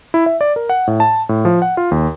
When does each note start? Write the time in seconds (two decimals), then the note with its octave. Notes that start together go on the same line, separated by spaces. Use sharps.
0.14 E4
0.26 E5
0.41 D5
0.56 A#4
0.69 F#5
0.87 A2
1.00 A5
1.29 A2
1.45 F3
1.62 F#5
1.77 F4
1.91 D#2